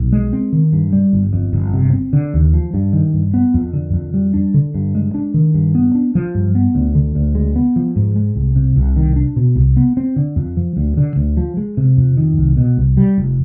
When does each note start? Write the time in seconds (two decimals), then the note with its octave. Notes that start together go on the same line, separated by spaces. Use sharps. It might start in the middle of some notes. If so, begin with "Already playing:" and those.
Already playing: B1
0.13 G#3
0.33 C4
0.53 D#3
0.73 G2
0.93 G3
1.13 G1
1.33 F2
1.53 G1
1.74 C3
1.93 C4
2.13 D3
2.34 D#2
2.54 F3
2.74 G2
2.93 D#3
3.14 G2
3.34 B3
3.54 F2
3.73 D3
3.93 F2
4.14 G3
4.34 D4
4.54 D3
4.75 G2
4.95 G#3
5.14 D4
5.34 D#3
5.54 G2
5.75 B3
5.95 D4
6.15 F3
6.35 G2
6.55 B3
6.75 D2
6.95 D3
7.15 D2
7.35 G#3
7.56 B3
7.76 F3
7.96 G#2
8.16 G#3
8.35 C2
8.56 C3
8.76 C2
8.96 D#3
9.16 D4
9.36 B2
9.56 C2
9.77 B3
9.97 C4
10.16 D3
10.36 F2
10.57 F3
10.77 D2
10.97 D3
11.16 D2
11.37 F3
11.57 G#3
11.77 C3
11.97 F2
12.17 D#3
12.38 C2
12.57 B2
12.77 C2
12.97 G3
13.18 F1